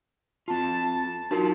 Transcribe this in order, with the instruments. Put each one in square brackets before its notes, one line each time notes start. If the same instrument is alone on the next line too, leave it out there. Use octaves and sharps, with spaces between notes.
[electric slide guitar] C4 F4 [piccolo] A5
[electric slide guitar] F#3 F4 A5 [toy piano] D#4 F#4 A#4